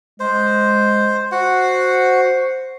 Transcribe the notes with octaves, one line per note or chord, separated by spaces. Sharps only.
G#3 C5
F#4 C5 F#5